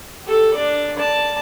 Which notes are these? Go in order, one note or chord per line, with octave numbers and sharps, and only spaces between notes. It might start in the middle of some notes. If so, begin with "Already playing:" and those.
G4 A4
D4 D5
D5 A5